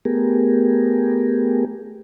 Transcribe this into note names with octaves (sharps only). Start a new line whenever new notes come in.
A3 B3 G4 G#4 A#4